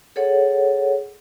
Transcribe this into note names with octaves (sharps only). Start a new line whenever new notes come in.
G#4 A4 C#5 F#5